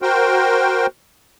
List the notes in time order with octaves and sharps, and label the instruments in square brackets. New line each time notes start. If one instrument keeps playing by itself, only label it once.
[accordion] F#4 A#4 C5 G5